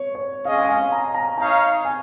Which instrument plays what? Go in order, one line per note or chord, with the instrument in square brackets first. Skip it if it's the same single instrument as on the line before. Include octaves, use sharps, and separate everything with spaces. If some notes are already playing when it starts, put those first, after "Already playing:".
Already playing: [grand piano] C#5
C#5
[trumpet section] G#3 C#4 G#4 D#5 [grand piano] F5
[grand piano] G#5
F5
A#5
A#5
[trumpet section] D#4 C#5 F5 [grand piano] A#5
[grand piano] G#5